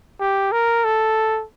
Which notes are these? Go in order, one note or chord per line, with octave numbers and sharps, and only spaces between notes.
G4
A#4
A4